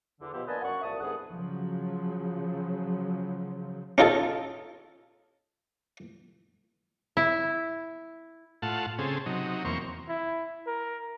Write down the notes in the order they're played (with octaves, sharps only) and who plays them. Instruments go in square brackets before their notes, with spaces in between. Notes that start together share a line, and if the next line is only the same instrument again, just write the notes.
[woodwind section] E2 D3
B2 F3 B3 E4 G4 C5
A#3 D4 B4 D#5 G#5 A5
F#2 F#5 C#6
C2 A#2 E5 A5 D#6
C2 G#2 D3 B3 G#4 F#5
[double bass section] C#3 F3 F#3
[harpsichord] C#4 D#4 F4 G#4 A4
[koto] E4
[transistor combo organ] A2 F4 F#5 A5
C#3 C4 G#4 A4
C3 F#3 D#4
E2 A#3 C4 C#6
[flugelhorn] E4
A#4